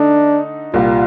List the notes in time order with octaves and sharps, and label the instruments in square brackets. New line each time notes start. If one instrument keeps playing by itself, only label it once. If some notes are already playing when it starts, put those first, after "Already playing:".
Already playing: [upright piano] D3 A3 D#4 [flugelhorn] D4
[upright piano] C2 A#2 G3 [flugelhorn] F4